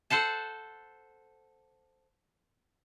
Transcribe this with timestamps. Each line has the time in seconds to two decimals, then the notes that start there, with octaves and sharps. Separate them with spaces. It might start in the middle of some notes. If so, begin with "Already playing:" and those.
0.10 A4 C5 F#5 A5